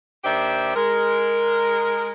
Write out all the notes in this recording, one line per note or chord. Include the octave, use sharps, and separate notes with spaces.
D#2 D#3 D4 G4 C5 E5
G#3 A#4